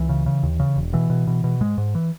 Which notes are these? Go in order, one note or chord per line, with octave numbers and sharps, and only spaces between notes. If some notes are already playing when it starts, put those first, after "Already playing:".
Already playing: C#2 E3
C#3
C#3
D#2
C#3
E1
B2 E3
B2
B2
B2
G#2 G#3
G#2
E3